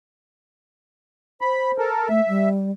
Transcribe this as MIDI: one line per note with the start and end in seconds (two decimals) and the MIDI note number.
1.41 1.89 72
1.41 1.71 83
1.78 2.08 69
1.78 2.08 70
2.09 2.21 57
2.09 2.49 76
2.28 2.71 55